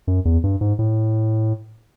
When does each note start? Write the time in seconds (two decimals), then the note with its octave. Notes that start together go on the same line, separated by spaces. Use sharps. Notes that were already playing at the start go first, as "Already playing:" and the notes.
0.07 F#2
0.25 E2
0.44 G2
0.61 G#2
0.79 A2